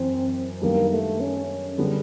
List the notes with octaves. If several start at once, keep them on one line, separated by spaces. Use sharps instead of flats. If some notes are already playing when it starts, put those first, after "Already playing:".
Already playing: F#2 E3 C4
F#2 D#3 G3 A#3 B3 D4
A3
C#4
D3 G3 B3 E4 G#4